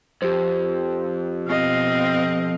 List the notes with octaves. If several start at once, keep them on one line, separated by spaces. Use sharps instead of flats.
F2 G4 C5
B2 C4 D#5 F5